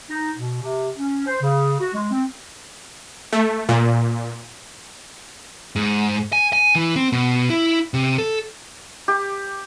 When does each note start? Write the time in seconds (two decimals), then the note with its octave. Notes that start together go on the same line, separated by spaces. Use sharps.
0.10 D#4
0.37 B2
0.62 C3
0.98 C#4
1.27 C5
1.42 C#3
1.80 F#4
1.94 G#3
2.11 C4
3.33 A3
3.69 A#2
5.76 G#2
6.33 G#5
6.53 G#5
6.76 E3
6.96 C4
7.12 B2
7.50 E4
7.94 C3
8.18 A4
9.08 G4